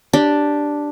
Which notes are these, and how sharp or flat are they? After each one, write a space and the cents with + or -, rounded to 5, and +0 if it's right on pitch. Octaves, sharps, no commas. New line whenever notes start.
D4 +0 G4 +0